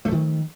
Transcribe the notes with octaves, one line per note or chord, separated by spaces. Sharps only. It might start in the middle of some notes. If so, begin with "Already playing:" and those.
D#3 F3 A3